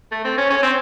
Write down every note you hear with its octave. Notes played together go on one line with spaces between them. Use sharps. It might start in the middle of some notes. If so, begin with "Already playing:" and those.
A3
C4
C#4
C#4
C4